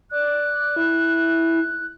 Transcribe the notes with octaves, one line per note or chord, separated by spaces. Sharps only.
D5 F#6
E4